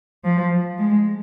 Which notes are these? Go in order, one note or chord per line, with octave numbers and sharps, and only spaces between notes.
F3
G#3